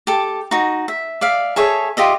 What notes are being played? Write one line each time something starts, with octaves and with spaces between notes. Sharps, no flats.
G4 A4
D#4 F#4
E5
D5 E5 F5
G#4 A4 C#5 E5
F4 G4 D#5 E5